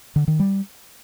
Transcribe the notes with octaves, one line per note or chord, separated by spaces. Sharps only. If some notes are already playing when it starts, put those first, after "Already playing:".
D3
D#3
G3